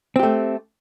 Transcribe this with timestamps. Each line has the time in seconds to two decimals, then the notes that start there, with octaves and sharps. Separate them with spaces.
0.16 C4
0.19 G4
0.23 A3